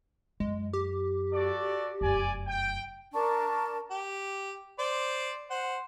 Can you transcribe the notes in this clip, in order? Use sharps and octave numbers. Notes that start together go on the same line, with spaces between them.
F#2 G#3
G4
F#4 A4 D5
F1 F#2 D5 G#5
G5
D4 A#4 A5 C#6
G4
C5 D5
C5 F#5